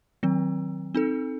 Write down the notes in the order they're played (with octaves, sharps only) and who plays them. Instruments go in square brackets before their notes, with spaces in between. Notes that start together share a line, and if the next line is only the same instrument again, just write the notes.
[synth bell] D#3 F#3 C4
C4 D#4 A4